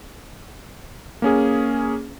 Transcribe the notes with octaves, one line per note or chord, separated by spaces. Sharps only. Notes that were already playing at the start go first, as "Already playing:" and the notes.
A#3 C#4 G#4